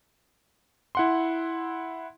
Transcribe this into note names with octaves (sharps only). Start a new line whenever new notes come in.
E4 F#5 C6